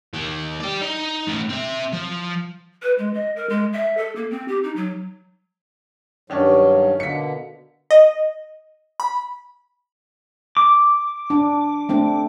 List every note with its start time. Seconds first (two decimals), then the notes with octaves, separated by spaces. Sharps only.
0.14 D#3 A#3
0.60 G4 D5
0.82 D#4
1.27 A3 C#4
1.49 C4 E5
1.93 F3
2.82 B4
2.98 G#3
3.14 D#5
3.36 A#4
3.49 G#3
3.73 E5
3.97 A4
4.16 A#3
4.31 C4
4.48 G4
4.64 D#4
4.76 F#3
6.30 G2 D#3 F#3 C#4 D4
7.00 B2 D3 A#3 B6 C#7
7.91 D#5
9.00 B5
10.57 D6
11.30 D4
11.89 A3 C4 D4